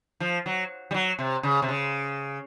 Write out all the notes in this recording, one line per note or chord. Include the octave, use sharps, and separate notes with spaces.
F3
F#3
G3
F#3
C3
C#3
C3
C#3